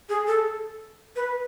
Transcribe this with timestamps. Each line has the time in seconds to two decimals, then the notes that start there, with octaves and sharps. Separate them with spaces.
0.09 G#4
0.27 A4
1.16 B4